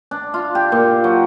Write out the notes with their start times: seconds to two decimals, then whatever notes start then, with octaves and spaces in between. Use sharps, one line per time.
0.11 D4
0.34 F4
0.55 G4
0.72 A#2
1.04 F#3